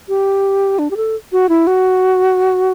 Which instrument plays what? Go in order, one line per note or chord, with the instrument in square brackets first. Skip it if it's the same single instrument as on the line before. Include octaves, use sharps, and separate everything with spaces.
[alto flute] G4
D4
G4
A4
F#4
E4
F#4